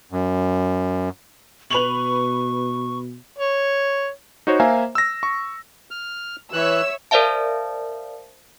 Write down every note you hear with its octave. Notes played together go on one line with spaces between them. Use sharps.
F#2
B2 B4 C#6 F7 F#7
C#5
D#4 F#4 C5 C#5
A#3 C5 E5 F5 G#5 A#5
E6 A#6
C#6
F6
E3 C#5 E5 E6 F#6
A#4 C5 D5 E5 F5 A5